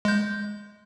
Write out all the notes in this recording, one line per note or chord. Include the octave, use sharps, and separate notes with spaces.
G#3 G6